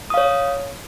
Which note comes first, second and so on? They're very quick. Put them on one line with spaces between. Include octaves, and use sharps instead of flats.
D#6 F5 C#5